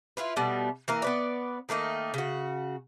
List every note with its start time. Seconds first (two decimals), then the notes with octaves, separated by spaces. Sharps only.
0.17 E4 F4 B4
0.36 B2 G3 A3 B3
0.88 E3 A#3 A#4
1.02 B3 B4 D5
1.69 D#3 A3 A#3 D#4
2.14 C#3 F#4